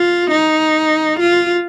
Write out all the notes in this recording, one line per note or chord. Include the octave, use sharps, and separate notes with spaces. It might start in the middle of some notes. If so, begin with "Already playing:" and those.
Already playing: F4
D#4
F4